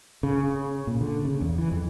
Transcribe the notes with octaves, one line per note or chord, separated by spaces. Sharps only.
C#3
A#2
D3
C#3
E2
E3
F2